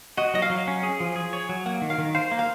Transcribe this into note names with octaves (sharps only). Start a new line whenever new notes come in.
F#4 D#5
F#3 D#5
F5
F#3
C#4
G#4
F3
G#4
C#5
F#3
A#3 F#5
D#3
F5
D#3
C5 F5
A#3
F5